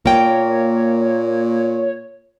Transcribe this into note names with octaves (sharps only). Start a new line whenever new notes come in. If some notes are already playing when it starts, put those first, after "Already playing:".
A#2 A#3 C#5 G5